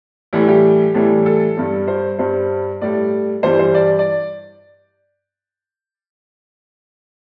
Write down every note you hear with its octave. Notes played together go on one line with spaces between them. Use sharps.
A2 E3 G3 E4
G4
A2 E3 G3
A4
G2 G3
C5
G2 G3 C5
A2 G3 D5
G2 E3 G3 C5
C5
D5
D5